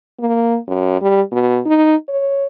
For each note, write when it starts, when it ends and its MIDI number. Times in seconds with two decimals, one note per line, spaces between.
0.20 0.58 58
0.68 1.00 42
1.02 1.21 55
1.32 1.60 47
1.66 1.95 63
2.08 2.47 73